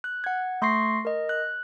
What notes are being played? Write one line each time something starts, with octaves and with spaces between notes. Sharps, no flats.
F#6
F#5 G#6
A3 C6 C#6 A#6 C7
A#4 D#5
F#6